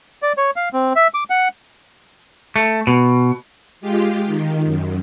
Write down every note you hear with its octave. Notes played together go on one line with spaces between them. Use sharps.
D5
C#5
F5
C4
E5
D6
F#5
A3
B2
G#3 F4 G4
D#3
F#2